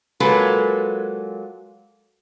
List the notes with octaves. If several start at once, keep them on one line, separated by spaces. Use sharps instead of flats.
F#3 G#3 A#3 F4 A4 B4